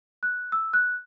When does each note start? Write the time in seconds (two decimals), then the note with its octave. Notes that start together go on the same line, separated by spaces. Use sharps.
0.23 F#6
0.52 E6
0.73 F#6